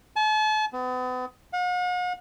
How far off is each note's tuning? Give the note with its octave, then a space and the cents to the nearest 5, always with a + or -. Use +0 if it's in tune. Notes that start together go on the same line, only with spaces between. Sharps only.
A5 -40
B3 +40
F#5 -45